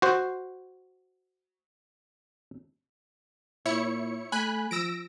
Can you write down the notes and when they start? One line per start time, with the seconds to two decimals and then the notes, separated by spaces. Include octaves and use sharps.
0.02 F#4 C5
3.66 A#2 E4 C#5 C#7
4.32 A3 G#5 B5 F#6
4.71 F3 E6 A#6 D7